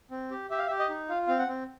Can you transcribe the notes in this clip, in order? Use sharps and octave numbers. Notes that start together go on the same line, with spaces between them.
C4
G4
G4 E5
F5
E5
G4
D#5
D#4
F4 F5
C4 F5
F#5
C4